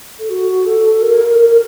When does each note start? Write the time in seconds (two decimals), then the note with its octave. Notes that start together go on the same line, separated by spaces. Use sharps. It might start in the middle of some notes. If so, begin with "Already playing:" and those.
0.19 A4
0.29 F#4
0.66 A4
1.02 A#4
1.38 A#4